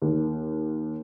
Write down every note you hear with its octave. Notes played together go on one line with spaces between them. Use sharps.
D#2